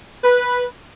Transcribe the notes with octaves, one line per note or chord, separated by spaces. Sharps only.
B4